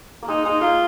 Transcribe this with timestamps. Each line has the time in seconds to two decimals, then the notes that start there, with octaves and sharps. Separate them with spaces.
0.23 A#3
0.28 G#3 D#4
0.45 G#3 D#4
0.61 A#3 F4